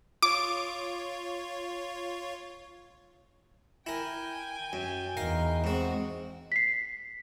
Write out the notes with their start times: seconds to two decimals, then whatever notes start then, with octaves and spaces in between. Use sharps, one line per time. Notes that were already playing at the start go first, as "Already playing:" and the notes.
0.22 F4 C#5 D6
3.87 E4 A#4 G5 G#5
4.73 F#2
5.17 E2 D#4 A#4 F5
5.64 G#2 C4 F#4
6.52 B6 C7